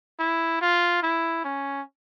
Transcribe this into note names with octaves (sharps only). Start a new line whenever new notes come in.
E4
F4
E4
C#4